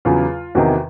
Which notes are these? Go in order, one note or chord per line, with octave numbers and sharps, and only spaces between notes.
E2 C#3 F#3 F4
E2 C3 D#3 F#4